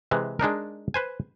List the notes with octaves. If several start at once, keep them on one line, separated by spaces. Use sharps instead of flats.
C3 E3 G#3
G#3 D4 D#4 A#4
B4 C5 G#5